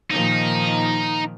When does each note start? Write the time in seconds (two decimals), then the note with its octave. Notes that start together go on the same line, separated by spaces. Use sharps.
0.11 A#2 D#3 F3 D#4